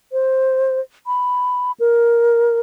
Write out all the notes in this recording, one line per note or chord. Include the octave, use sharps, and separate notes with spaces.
C5
B5
A#4